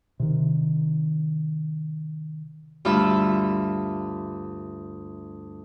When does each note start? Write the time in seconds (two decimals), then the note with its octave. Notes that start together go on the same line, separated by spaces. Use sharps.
0.20 C3 D#3
2.85 D2 G2 F4 E5 B5 E6